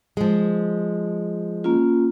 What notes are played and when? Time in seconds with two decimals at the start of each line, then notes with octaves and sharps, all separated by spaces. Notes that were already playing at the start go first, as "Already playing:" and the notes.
0.17 F3 G#3
1.64 A#3 C#4 F4